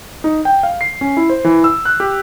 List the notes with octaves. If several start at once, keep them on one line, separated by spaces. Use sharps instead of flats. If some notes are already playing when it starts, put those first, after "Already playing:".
D#4
G5
F5
C7
C#4
E4
C5
E3
E6
F#6
G4